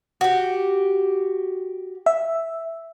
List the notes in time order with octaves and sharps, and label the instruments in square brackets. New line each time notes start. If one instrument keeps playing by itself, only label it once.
[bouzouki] F#4 G4
[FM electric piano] E5